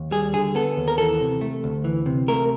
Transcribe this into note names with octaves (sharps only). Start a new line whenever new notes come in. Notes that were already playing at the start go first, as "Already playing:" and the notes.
Already playing: D#2
G3 G#4
D3 G#4
B3 A4
D#2
A#4
E3 A4
C3
A3
D2
E3
C3
A3 A#4